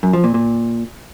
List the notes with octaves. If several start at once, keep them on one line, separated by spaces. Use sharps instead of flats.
F#2
F3
A#2
A#2